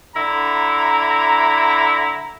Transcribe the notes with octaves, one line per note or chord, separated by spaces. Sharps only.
D3 E4 A#5